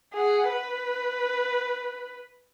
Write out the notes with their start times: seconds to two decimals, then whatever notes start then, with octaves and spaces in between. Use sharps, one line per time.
0.14 G#4 F#5
0.49 B4